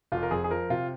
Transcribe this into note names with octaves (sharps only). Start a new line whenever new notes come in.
F1 F4
A#4
F2 G#4
G#4
F3 A#4
C3 F4